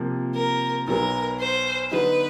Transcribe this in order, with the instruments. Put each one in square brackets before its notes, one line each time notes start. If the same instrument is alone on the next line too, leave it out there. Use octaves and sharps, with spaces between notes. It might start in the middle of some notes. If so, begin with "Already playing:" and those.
Already playing: [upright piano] C3 F3 A#3
[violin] A#4
[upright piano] B1 B2 F#3 B3 [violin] A#4
[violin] C5
[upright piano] D3 F#3 B3 D#4 [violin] B4